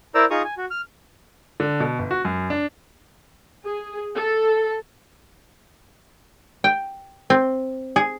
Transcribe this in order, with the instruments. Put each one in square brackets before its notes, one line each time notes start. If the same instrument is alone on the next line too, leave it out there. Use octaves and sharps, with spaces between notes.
[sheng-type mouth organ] E4 A#4 C5 D5 A#5 E6
D#4 F4 G#4 A#5 C#6 D#6
G#5
F#4
F6
[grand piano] D3
B2
G1
F#4
F#2
D4
[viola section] G#4
A4
[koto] G5
C4
G#4